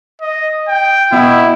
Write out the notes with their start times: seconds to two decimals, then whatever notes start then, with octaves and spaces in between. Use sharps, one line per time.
0.22 D#5
0.68 G5
1.12 B2 E4